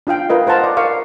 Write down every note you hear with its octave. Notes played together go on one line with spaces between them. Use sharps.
D4 F4 F5 G5
F4 A#4 B4 D#5 E5
A#4 C5 F#5 A5 A#5
D5
A#4 F5 C#6